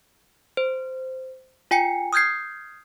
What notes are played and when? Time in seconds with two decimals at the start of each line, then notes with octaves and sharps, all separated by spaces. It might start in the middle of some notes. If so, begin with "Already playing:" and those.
0.57 C5
1.71 F4 G5 G#5 C#7
2.13 D#6 F6 G6 G#6 C7